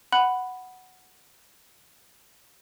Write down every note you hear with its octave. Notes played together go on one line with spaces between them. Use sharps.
F#5 B5 F#6 F#7